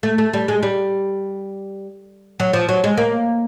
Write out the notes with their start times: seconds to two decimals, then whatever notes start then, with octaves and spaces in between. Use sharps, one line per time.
0.03 A3
0.18 A3
0.33 G3
0.48 G#3
0.63 G3
2.40 F#3
2.53 F3
2.69 F#3
2.84 G#3
2.97 A#3